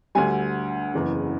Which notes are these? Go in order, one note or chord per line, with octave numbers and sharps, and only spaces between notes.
D2 D3 G3 G#5
F#1 E2 C#3